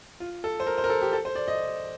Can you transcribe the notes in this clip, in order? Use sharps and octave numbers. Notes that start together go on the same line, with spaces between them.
F4
A4
C5
A#4
C5
A#4
A4
G4
A4
C5
D5
D#5